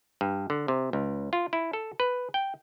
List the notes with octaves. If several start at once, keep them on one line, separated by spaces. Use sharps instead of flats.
G2
D3
C3
C#2
F4
E4
A4
B4
G5